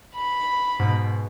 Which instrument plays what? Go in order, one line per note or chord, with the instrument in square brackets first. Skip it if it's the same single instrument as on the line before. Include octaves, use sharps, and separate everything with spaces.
[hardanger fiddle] B5
[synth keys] G#2 B2